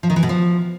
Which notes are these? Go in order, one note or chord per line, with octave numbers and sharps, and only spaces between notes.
F3
D#3
E3
B2
F3